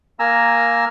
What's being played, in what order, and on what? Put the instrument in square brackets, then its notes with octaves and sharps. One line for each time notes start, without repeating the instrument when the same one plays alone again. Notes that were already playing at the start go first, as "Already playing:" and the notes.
[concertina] A#3 G#5 A#5 E6